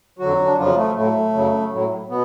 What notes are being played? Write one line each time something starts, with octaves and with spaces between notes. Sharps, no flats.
F2 D3 F#3 F#4
D4
F2 C#3 F3 F#3 F4
A3
A2 F#3 A3
F#2 C#3 F#3
A2 F#3
B2 B3